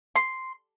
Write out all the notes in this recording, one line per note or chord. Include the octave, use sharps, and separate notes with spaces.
C6